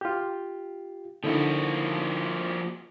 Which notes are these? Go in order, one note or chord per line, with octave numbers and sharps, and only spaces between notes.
F4 G4
D3 F3 A#3 D#4 E4 F#4